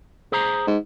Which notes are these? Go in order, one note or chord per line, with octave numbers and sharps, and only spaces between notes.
G#4 C5 A#5
G#2